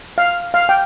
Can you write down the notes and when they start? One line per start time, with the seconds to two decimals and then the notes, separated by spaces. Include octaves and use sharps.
0.18 F5
0.54 F5
0.69 G5